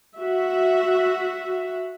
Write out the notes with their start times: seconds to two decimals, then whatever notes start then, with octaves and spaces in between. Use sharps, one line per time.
0.17 F#4 E5